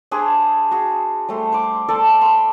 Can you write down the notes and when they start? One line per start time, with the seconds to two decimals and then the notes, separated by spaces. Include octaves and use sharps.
0.11 D4 G4 G#4 C5
0.71 F#4 G#4
1.29 G3 A3 C5
1.52 C5 D6
1.88 A4 C5 D5 A5
2.21 B5 C6